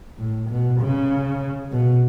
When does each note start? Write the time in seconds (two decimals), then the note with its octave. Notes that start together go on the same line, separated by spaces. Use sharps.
0.18 A2
0.50 B2
0.80 C#3
1.72 B2